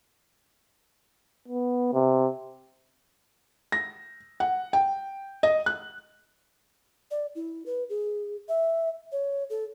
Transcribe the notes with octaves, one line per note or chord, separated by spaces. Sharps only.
B3
C3
A#6
F#5
G5
D#5
F#6
D5
E4
B4
G#4
E5
C#5
A4